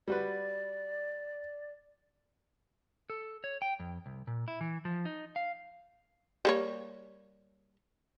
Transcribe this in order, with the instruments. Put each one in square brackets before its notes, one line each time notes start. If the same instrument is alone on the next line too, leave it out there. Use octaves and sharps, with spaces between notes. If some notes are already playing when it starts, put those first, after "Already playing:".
[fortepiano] G3 F#4 B4 [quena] D5
[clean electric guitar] A4
C#5
G5
F2
C2
A#2
E4
E3
F3
D#4
F5
[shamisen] G3 A#3 C#5